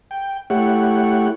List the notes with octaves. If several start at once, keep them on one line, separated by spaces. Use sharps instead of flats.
G5
A3 E4 G4 C#5 F#5